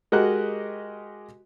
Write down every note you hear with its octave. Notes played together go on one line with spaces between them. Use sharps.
G#3 F#4 G4 A#4 D#5 F#6